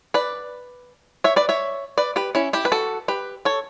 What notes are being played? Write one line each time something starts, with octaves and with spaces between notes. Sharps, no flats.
B4 D5
C#5 E5
B4 D5
C#5 E5
B4 D5
G4 B4
C#4 E4
E4 G4
B4
F#4 A4
G4 B4
A4 C#5